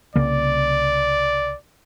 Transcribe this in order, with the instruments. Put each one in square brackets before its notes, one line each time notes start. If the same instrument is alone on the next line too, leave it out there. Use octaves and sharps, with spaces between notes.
[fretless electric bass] C2 C#3 A#3 [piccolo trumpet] D5